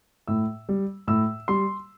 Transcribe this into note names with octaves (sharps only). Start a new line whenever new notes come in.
A2 E6
G3
A2 E6
G3 C6